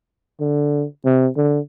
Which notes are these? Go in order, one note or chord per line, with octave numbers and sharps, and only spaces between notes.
D3
C3
D3